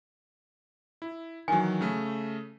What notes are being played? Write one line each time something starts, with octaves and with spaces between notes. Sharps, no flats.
E4
D#3 E3 F#3 G#5
C#3 A3